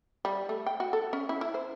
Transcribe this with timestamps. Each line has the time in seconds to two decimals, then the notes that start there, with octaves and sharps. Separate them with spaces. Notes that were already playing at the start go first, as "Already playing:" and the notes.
0.25 G3
0.49 A3
0.66 G5
0.80 F#4
0.93 A4
1.13 C#4
1.29 E4
1.41 E4
1.54 C5